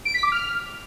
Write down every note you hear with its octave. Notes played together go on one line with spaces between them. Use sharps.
D7
B6
D6
F6